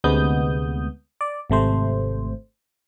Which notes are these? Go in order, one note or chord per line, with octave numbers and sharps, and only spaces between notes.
D2 C3 G#3 B3 D#6 G6
D5
G#1 C3 A3 C5